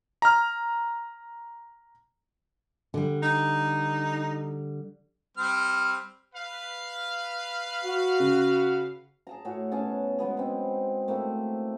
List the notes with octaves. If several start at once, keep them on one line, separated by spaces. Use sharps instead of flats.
A#5 F6
D3 G3
D#4
G3 C4 F6
B4 F5
F#4
C#3
G#4 A5 A#5
A2 F#4 G#4 C#5
B2 C#4 G#4 A5
F#3 G#3 B3 G#4
C4 D#4
A3 A#3 C4 E4